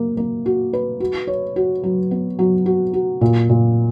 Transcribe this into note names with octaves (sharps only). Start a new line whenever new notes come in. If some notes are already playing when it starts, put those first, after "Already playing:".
Already playing: A#3
A#3
F#4
B4
F#4
C#5
F#4
F#3
B3
F#3
F#4
F#4
A#2
A#2